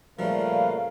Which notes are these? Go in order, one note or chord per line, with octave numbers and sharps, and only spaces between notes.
A#2 C#3 F3 G3 A3 A#4 B4 F5